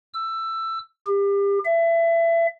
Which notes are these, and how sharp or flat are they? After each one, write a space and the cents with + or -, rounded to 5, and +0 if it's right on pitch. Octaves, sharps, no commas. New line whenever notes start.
E6 +15
G4 +30
E5 +25